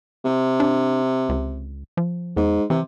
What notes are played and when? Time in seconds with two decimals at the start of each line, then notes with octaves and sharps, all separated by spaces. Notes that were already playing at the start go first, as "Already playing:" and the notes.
0.25 C3
0.60 D4
1.29 C#2
1.97 F3
2.36 E2 G#2
2.70 C3 E3